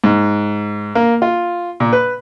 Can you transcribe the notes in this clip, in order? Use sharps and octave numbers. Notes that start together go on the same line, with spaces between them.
G#2
A#3
F4
A#2
B4